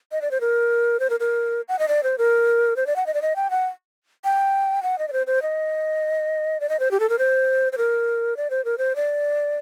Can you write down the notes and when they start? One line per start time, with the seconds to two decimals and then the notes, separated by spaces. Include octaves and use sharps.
0.12 D#5
0.22 D5
0.31 C5
0.41 A#4
1.00 C5
1.10 A#4
1.20 A#4
1.68 F#5
1.79 D#5
1.88 D5
2.03 C5
2.18 A#4
2.76 C5
2.87 D5
2.96 F#5
3.06 D#5
3.14 D5
3.22 D#5
3.36 G5
3.50 F#5
4.24 G5
4.83 F#5
4.99 D#5
5.08 D5
5.13 C5
5.27 C5
5.42 D#5
6.60 D5
6.69 D#5
6.80 C5
6.91 G4
7.00 A4
7.09 A#4
7.19 C5
7.73 C5
7.78 A#4
8.37 D5
8.50 C5
8.65 A#4
8.78 C5
8.96 D5